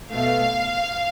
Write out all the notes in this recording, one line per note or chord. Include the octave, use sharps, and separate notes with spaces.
B2 A3 F5